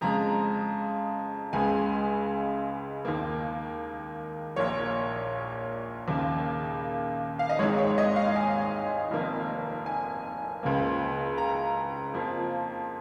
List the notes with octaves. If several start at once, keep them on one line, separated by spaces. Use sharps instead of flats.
F2 C#3 G#3 A#5
C#2 C#3 G#3 G#5
D#2 D#3 A#3
A#1 A#2 A#3 C#5
D#2 C#3 A#3
F5
D#5
G#1 G#2 G#3 C#5
C#5
D#5
F5
G#5
F1 F2 D#3 A#3
G#5
C#2 C#3 F3 A#3
A#5
F2 F3 A#3